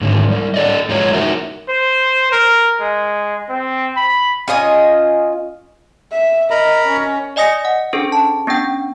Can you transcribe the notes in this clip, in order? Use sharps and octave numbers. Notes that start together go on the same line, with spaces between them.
G#2 D3 D#3
G3 E4
A4 D5 D#5
E2 G#3 F4 G4 C#5 A#5
D#4 E4 F#4 A#4 E5
C5
A#4
G#3
C4
B5
C#4 F4 D#5 G#5
E5
A#4 D#5 A#5 B5
C#4
D5 D#5 G#5 D#6 A#6 C#7
F#5
C#4 D4 G#4 A4 C5
A5
B3 C#4 D4 G5